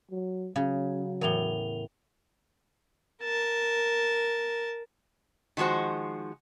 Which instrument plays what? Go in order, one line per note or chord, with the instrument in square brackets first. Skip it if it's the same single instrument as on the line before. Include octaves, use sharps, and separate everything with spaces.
[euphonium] F#3
[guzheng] C#3 [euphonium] F#3
[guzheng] E2 A2 [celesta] A#4 F7 G7
[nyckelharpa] A#4 A5
[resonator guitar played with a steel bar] D#3 F3 G#3 F#4 C5